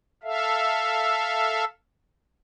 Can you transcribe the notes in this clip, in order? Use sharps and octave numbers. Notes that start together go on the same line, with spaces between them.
A4 E5 F5